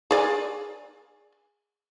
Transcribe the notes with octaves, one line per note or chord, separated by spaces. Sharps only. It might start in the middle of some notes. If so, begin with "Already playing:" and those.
G#4 D5 G#5